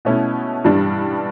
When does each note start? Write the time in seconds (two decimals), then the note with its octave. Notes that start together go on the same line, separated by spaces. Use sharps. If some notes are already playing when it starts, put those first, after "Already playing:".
0.05 B2 A3 C#4 E4
0.64 G2 E3 G3 D4